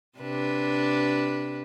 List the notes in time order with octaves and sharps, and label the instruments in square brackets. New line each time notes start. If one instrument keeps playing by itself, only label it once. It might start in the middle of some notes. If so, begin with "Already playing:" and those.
[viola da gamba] C3 D4 B4